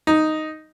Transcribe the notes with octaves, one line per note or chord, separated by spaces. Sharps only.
D#4